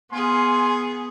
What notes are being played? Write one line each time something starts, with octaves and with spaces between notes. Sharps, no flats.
B3 G#4 F5 G#5 C6